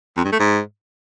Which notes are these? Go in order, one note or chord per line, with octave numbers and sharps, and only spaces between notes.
F2
G2
A3
G#2